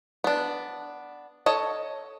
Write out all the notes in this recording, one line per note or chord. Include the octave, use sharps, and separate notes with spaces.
B3 D4
A4 C#5 D#5